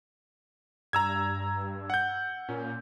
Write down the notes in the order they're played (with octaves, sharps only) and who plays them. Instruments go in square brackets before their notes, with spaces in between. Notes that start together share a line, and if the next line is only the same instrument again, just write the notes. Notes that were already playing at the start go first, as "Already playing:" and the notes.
[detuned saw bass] G2 [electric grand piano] A#5 E6 G#6
[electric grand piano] F#5 G6
[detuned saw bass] A#2 [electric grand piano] C#4